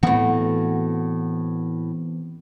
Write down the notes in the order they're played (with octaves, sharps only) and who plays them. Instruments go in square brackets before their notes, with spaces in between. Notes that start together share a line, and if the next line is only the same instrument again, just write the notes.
[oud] A2 F#4 [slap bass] E3 B3 C4